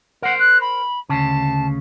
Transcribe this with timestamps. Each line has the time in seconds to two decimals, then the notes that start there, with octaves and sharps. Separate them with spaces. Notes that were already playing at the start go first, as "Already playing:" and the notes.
0.22 A#4 C5 F#5
0.39 F#6
0.61 B5
1.09 D2 C#3 A5